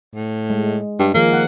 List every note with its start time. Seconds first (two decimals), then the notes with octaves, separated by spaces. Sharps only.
0.15 A2
0.50 G#3
0.99 G2
1.14 D#3 F3 A#3 G#4
1.33 F#5